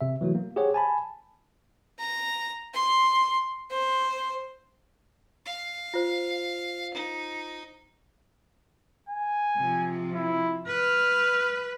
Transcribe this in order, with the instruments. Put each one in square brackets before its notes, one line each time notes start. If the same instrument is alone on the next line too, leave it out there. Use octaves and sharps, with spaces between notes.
[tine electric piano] C3 E5
E3 F#3 A3 F#4
A#3
G4 G#4 C5 C#5 F#5
G#5 A5 B5
[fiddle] A#5
C6
C5
[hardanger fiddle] F5
[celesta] F4 C5
[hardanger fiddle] D#4
[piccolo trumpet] G#5
[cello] C3 F3
[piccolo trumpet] E4
[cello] B4 [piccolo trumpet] F6